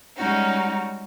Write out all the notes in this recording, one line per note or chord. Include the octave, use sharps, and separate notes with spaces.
G3 G#3 C#4 D#4 F#4